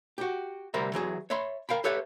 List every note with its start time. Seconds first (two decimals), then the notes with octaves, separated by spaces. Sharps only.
0.18 F#4 G4
0.74 D2 C3 G3 A#4 C5 E5
0.93 E3 F#3 G#4
1.30 C#5 E5 B5 C6
1.69 A#4 F5 G5 B5
1.84 G4 A4 B4 C#5 E5